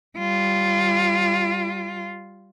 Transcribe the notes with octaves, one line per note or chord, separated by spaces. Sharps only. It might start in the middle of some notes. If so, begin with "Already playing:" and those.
G3 F4